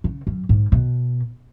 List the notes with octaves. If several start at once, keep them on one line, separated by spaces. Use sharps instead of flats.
C#3
F#2
G#2
B2